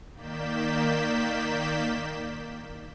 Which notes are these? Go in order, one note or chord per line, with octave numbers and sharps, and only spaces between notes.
D#3 A#3 D5 G6 B6 E7